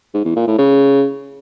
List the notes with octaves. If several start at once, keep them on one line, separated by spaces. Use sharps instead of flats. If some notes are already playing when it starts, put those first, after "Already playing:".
G#2
E2
A#2
A2
C#3